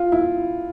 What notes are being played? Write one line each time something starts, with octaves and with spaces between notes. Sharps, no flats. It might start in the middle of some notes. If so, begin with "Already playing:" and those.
Already playing: F4
E4